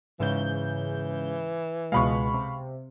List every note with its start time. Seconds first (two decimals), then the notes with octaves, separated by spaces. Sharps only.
0.20 G#2 C#3 E3 G6
1.92 C#2 B2 G#3 F5 B5 C#6
2.34 C3